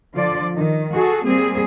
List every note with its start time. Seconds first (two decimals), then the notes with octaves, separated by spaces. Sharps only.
0.14 D3 F3 F4 D5
0.54 D#3
0.93 F#4 G#4 A4
1.25 G3 A#3 C4 G#4